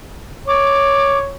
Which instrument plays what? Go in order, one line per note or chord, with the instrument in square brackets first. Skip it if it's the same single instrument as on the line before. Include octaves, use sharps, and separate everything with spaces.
[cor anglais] C#5 [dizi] D6